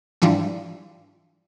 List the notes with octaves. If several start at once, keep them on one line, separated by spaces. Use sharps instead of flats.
G#2 E3 F3 G3 D4 F4